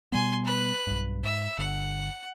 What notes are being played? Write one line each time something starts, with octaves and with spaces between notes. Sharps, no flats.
B2 G3 B3 G#5 C6
B4 F#6
B1 G2
G#2 E5 E6
G1 D3 F#5